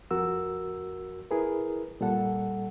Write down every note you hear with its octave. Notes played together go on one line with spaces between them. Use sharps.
F2 F#4 A#4 E6
E4 G#4 A#4 B4
A#2 G3 A4 F#5